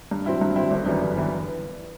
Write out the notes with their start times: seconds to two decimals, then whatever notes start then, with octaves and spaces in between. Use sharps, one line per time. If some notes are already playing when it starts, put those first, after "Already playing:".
0.11 G2
0.26 F#3 C4 E4
0.41 G2
0.56 F#3 C4 E4
0.71 G1
0.86 F#2 E3 G3 B3
1.01 G1
1.16 E3 G3 B3